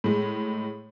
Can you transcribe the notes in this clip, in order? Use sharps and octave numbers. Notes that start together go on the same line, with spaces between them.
A2 G#3